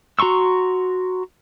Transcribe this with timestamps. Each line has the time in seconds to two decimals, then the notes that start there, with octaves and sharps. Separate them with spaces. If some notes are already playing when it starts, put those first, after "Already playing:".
0.19 F#4 A#5 C6 C#6 E6